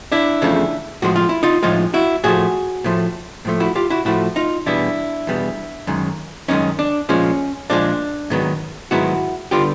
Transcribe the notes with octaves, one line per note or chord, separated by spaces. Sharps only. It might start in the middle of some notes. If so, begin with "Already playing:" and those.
D4 E4
E2 C#3 F3 A3
A2 F3 G#3 F#4
F4
E4
D#4 F4
A2 F3 G#3 D#4 F4
E4 F#4
A2 F3 A3 F#4 G#4
A2 F3 A3
A2 F3 A3
E4 F#4
F4 G4
E4 F#4
A2 F3 A3 E4 F#4
D#4 F4
E2 B2 G3 B3 D4 E4
E2 B2 G3 B3
F#2 D#3 G#3
F#2 D#3 G#3 C#4 D#4
D4
A#2 F3 G#3 C#4
A#2 F3 G#3 D4
G#2 D#3 F#3 B3
G#2 D#3 F#3 B3 E4 F#4
D3 G3 B3 F4 G4